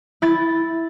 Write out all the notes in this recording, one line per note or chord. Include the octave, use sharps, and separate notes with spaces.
E4 A6